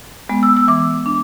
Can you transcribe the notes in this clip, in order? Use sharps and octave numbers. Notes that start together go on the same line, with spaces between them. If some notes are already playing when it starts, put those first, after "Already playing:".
G#3 B3
E6
E6
E3 D6
D4